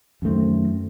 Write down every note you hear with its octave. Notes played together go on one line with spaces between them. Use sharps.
F#2 D#3 A3 C4